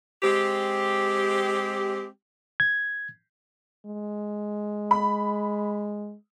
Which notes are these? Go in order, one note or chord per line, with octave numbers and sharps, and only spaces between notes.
G#3 C4 G4
G#6
G#3
B5